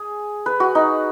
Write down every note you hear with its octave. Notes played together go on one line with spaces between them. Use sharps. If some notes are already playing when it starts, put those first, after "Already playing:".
Already playing: G#4
B4
F#4
D#4